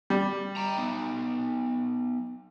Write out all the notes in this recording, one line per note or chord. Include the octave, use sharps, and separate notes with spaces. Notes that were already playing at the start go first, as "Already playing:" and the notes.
G3
G5 A#5
B3 D#4